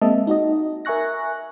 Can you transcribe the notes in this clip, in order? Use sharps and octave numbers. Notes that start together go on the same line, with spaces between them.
G#3 A#3 C4 D#5 E5 A5
D#4 F#4 D#5
A#4 E5 G#5 C#6 F#6 A#6